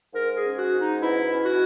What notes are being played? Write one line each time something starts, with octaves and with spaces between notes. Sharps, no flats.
G#2 A#4
G#4
C#4
F#4
G#2
D#4
B2 E4
C#4
F#4